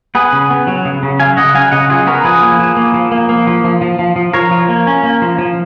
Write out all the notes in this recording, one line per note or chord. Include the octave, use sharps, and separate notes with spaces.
B3 G#4 B4
C#3
B3
F#3
C#3
C#3
F#3 F5 G#5
C#3 D#5 F#5
F#3 F5 G#5
C#3 D#5 F#5
F#3 F4 G#4
B3 F#4 A#4
F3 G#4 B4
A#3
F3
A#3
F3
A#3
A#3
F3
F3
F3
F3
F3
F3 A#4 C#5
F3
A#3
C#4
A#3
F3
F3